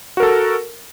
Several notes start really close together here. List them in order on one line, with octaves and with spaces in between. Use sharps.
F#4 A#4 A4